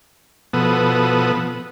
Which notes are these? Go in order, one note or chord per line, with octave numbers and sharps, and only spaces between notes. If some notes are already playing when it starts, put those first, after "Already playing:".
B2 F3 B3 A4 B4 D#6